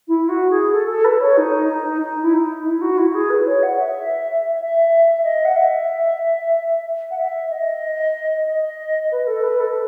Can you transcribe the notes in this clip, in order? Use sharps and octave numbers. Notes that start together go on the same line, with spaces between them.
E4
F#4
G#4
A4
A4
B4
C#5
D#4
D#4
D#4
E4
D#4
E4
F#4
E4
G#4
B4
C#5
F#5
E5
E5
D#5
F#5
E5
F#5
E5
D#5
D#5
B4
A4
B4
A4